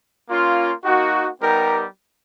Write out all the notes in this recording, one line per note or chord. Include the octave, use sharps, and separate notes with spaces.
A#3 C#4 F4
A#3 D#4 F#4
G3 B3 D#4 G4 A#4